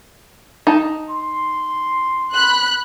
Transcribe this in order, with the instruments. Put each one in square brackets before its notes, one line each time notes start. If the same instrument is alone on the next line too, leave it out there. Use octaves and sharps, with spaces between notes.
[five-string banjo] D#4 A5
[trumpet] C6
[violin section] B5 F#6